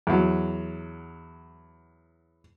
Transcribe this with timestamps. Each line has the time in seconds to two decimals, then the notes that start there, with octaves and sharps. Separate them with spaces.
0.07 E2 F#3